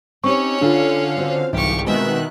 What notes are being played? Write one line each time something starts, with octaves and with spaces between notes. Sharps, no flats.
C4 C#4 D#4 G4 C#5 C#6
D3 D4 F4 A4 F5 A5
C4 F#4 C5
G1 C2 G#2 E3 G4 F5 C#6
B2 D#3 G#3 B3 C4 E5 F#6